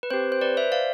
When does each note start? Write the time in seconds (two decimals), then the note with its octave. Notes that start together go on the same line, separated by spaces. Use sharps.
0.03 B4
0.10 C4 G4 C5
0.32 C5
0.41 B4 D5
0.57 C5 E5
0.72 D5 F5